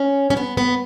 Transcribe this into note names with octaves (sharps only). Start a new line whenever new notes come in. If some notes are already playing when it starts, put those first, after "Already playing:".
Already playing: C#4
C#4
B3
B3